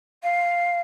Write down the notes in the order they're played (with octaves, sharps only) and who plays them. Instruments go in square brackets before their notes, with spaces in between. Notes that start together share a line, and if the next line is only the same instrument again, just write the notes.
[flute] F5